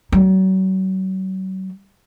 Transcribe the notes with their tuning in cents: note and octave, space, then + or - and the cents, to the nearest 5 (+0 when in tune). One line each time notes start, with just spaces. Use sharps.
F#3 +35